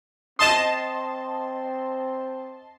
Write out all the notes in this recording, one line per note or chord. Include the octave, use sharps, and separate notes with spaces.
C4 D#5 A5 C6 D#6 E7